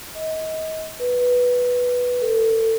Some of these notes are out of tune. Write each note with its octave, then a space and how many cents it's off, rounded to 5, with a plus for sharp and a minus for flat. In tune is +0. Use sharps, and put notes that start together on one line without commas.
D#5 +30
B4 -5
A4 +30